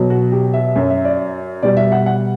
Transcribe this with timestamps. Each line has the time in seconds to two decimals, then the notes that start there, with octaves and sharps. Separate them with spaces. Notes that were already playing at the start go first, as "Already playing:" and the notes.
Already playing: B2 F#3
0.10 F#4
0.32 G4
0.54 E5
0.76 F#2 F#3
0.90 E5
1.05 D5
1.63 B2 G3 D5
1.77 E5
1.92 F#5
2.06 F#5